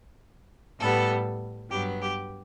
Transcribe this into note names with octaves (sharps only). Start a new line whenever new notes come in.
A2 G3 B3 A4
G2 F#3 B3 G4
G4